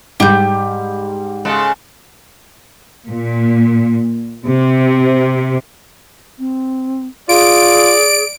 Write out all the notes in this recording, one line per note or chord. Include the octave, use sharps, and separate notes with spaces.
G#2 G3 G4 G6
C#3 G#3 A4
A#2
C3
C4
F4 G#4 D5 D7